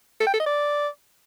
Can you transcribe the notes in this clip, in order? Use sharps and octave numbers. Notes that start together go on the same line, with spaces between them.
A4
G5
A4
D#5
D5